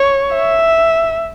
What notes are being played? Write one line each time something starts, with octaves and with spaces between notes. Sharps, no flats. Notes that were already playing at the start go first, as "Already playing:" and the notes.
Already playing: C#5
E5